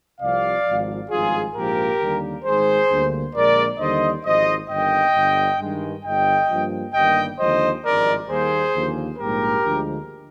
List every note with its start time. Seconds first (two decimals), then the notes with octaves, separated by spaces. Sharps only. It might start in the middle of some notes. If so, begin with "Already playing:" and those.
0.21 C2 C3 F3 D5 F5
0.66 G#1 G#2 F3
1.10 G#1 G2 F3 G#3 F4 G#4
1.55 A#1 G#2 F3 A#3 G4 A#4
2.00 D#2 D3 G3 A#3
2.45 G#1 G#2 D#3 G#3 G#4 C5
2.90 D2 D3 G3 A#3
3.35 A#1 A#2 G#3 A#4 D5
3.79 D#2 D3 G3 C5 D#5
4.24 G#1 G#2 F3 C5 D#5
4.69 G1 G2 D#3 A#3 D#5 G5
5.14 G1 G2 D3
5.59 G2 D#3 G#3
6.04 G1 G2 D3 D#5 G5
6.49 G2 F3 A#3
6.94 G1 G2 D#3 G3 A#3 D#5 G5
7.39 D#2 D3 F3 G#3 C5 D#5
7.84 G#1 G2 F3 G#3 A#4 D5
8.29 D#2 D#3 G3 A#3 G#4 C5
8.74 D#2 D3 F3 A#3
9.18 A#1 G#2 G3 A#3 G4 A#4
9.64 D2 D3 F3 G#3